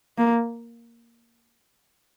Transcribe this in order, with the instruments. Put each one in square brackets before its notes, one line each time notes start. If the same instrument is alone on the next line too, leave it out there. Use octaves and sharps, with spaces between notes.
[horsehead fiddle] A#3